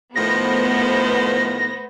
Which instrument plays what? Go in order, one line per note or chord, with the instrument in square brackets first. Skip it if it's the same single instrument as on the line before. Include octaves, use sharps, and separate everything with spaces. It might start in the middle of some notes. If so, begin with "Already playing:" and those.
[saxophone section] A2 D#3 F3 [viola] A3 C5 [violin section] B3 [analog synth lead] A#6